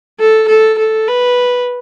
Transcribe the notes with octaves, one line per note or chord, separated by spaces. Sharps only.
A4
A4
A4
B4